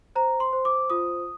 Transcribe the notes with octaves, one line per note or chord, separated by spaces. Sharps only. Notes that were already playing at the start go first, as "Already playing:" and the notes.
C5 A#5
C6
C5
D6
F4 D#6